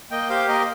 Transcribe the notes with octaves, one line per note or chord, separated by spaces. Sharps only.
A#3 D#5 G5
G4 C5 F5
A#3 A#4 D#5